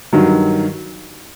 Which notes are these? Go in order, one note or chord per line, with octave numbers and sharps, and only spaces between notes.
G2 D#3 F#3